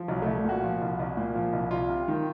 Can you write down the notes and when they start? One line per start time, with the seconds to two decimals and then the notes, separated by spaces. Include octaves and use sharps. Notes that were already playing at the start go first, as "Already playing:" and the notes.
Already playing: F3
0.08 C2 F#3
0.22 C2 A3
0.35 A3
0.44 A#2 F#4
0.63 F3
0.82 C2
0.99 C2
1.17 A#2
1.35 F3
1.53 C2
1.71 C2 F4
1.90 C3
2.08 D#3